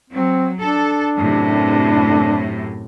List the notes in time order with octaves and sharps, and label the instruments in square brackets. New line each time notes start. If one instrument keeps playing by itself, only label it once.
[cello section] F#3 [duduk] C4
[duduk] D4 [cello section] A4
[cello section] F#2 A2 C3